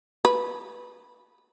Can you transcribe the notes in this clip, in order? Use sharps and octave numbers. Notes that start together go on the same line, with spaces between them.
B4